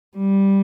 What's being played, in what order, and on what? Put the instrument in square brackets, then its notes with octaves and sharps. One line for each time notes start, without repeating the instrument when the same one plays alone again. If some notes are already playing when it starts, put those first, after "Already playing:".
[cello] G3